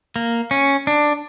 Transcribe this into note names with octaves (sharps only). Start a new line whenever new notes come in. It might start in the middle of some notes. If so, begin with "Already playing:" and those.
A#3
C#4
D4